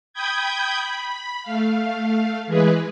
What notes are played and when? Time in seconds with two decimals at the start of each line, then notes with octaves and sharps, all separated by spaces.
0.13 G5 B5 D#6 G6 G#6
0.82 B5
1.43 A3 F5
2.47 E3 G#3 G#4 B4